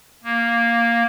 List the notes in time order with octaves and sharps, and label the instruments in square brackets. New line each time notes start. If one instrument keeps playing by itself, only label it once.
[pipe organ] A#3